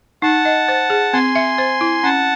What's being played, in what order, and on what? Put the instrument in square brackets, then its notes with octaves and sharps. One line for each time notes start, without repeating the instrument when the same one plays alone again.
[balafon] D#4 [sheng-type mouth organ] F#5 A5
[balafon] D#5
C5
G#4
[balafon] C4 [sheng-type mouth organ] G#5 C6
[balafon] E5
C5
E4
[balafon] C#4 [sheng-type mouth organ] F#5 A5